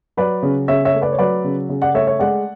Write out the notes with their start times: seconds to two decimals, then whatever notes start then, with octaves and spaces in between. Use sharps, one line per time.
0.17 F#3 B4 D5
0.43 C#3
0.68 C#3 C#5 E5
0.85 C#5 E5
0.94 A3
1.02 B4 D5
1.12 C#5
1.19 F#3 B4 D5
1.44 C#3
1.69 C#3
1.82 D5 F#5
1.94 A3 C#5 E5
2.07 C#5 E5
2.20 G#3 D5 F#5